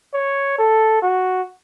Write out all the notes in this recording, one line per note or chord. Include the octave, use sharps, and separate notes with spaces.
C#5
A4
F#4